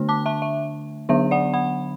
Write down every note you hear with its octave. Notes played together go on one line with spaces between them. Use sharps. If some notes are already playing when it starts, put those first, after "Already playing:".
Already playing: D3 A3 D4
A5 D6
E5 A5
E5
D3 F#3 B3 D4 E5
D5 F#5
F#5 B5